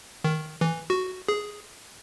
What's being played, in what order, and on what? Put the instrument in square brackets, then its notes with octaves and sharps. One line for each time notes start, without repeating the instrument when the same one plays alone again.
[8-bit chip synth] D#3
E3
F#4
G#4